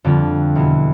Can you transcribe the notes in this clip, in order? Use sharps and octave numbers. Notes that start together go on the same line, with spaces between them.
F2 D3 G3 C4 F4
E2 B2 B3 E4